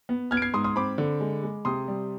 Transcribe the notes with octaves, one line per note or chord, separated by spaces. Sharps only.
B3
B3 F6 G#6
D7
G#6 C7
G#2 C6 D#6
C6 D#6
C4 B5 D6
D3
G#3
G#3
C3 C6 D#6
G3